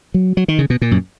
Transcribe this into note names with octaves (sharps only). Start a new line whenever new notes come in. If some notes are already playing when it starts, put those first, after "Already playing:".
F#3
F#3
D#3
C#3
B2
A#2
F#2